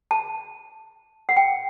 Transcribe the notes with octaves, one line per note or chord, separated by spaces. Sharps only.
A5
F#5
G5